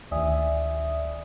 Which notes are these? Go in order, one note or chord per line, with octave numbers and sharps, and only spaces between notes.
D2 D#3 D5 E5 G#5 D#6